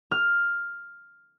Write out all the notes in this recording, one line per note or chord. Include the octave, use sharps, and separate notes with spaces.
F6